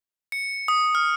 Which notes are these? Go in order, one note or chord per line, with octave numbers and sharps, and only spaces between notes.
C#7
D#6
F6